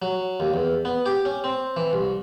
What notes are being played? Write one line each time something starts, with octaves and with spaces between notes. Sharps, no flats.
F#3
D#2
E2
B3
G4
C#4
C4
E3
C2